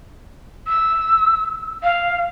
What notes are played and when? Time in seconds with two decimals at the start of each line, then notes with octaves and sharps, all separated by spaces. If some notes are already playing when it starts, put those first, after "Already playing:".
0.67 E6
1.83 F5